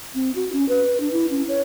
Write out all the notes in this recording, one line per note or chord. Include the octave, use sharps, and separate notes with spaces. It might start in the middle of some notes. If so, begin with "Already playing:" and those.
C4
F#4
C#4
B4
D4
E4
C#4
C#5